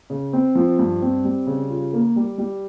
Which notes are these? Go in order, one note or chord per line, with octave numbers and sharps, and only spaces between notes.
C#3
C4
F3
G2
C4
G3
C#3
F4
A#3
G3
G3